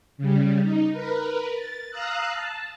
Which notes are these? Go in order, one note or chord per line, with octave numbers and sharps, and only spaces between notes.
C#3 G3
D#4
A#4 B4
A6
F5 A#5 D#6 E6 F#6
A5